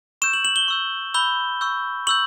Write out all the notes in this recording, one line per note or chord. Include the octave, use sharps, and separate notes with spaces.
C#6 E6 G6 E7
F#7
F#7
G7
C#6 E6 G6
B5 E6 G6 G7
C#6 E6 G6
C#6 E6 G6 F#7